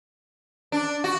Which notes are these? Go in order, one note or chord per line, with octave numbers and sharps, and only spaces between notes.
D4
F#4